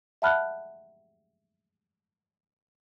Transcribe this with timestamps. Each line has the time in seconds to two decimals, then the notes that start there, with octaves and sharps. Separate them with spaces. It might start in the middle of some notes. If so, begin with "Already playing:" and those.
0.22 E5 F#5 A5 B5 F6 F#6